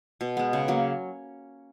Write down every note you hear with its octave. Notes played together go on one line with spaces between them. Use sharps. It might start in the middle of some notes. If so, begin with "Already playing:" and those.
B2
G#3 B3
C#3
F#3 A#3 C#4